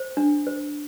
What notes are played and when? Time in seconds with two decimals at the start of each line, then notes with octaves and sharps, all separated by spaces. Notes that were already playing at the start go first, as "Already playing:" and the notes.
Already playing: C5
0.17 D4
0.47 C5